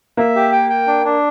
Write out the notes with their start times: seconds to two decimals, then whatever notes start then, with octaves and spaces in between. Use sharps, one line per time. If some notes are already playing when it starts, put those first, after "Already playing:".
0.17 A#3 E5
0.36 G4
0.52 G5
0.70 G5
0.87 D4
1.05 D4